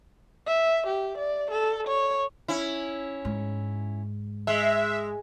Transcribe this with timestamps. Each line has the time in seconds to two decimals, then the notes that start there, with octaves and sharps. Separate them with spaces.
0.47 E5
0.87 G4
1.18 D5
1.51 A4
1.88 C#5
2.48 C#4 E4
3.25 G#2
4.47 G#3 E5